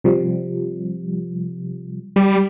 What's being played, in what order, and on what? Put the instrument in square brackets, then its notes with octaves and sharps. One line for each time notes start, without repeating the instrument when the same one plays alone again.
[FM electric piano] C3 F3 G3
[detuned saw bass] G3